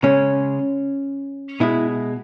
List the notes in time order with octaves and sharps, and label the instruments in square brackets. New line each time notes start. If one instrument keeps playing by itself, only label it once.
[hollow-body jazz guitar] C#3 G#3 C#4
B2 G#3 E4